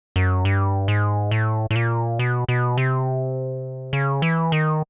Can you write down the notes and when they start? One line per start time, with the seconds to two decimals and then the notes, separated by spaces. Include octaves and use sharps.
0.16 F#2
0.45 G2
0.88 G#2
1.31 A2
1.71 A2
1.76 A#2
2.19 B2
2.49 B2
2.77 C3
3.93 C#3
4.22 E3
4.52 D#3